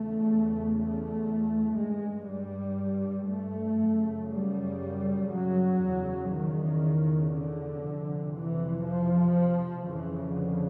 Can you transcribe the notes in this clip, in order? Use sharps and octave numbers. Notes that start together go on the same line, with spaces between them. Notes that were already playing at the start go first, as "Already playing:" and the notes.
Already playing: E2 C#3 A3
A3
G2 G#3
G3
A3
F#2 C#3
G3
F#3
E2 C#3
D#3
D3
F2 C3
E3
F3
F2 C#3 E3
D3